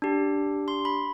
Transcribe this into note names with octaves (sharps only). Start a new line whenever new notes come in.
D4 G4
C6
B5